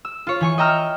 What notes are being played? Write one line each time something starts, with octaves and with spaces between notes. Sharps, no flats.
E6
F4 C#5
E3 G#5 C#6
D#5 G5 A#5 E6 F6